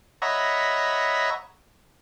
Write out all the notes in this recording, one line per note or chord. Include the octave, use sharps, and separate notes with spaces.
C#5 D#5 E5 F#5 A#5 B5